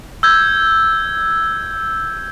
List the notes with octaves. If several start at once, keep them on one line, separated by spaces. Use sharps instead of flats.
E6 G6 G#6